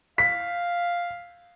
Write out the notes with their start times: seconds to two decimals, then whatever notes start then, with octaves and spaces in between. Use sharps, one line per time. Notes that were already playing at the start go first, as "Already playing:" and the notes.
0.18 F5 B6